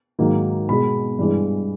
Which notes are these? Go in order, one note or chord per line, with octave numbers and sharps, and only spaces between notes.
G#2 D#3 F#3 A#3
B2 G#3 B5
G2 E3 G#3